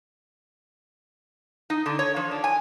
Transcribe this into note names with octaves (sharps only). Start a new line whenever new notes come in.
D#4
D3
C#5
F3
D4
G#5